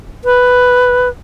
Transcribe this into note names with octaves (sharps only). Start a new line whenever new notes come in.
B4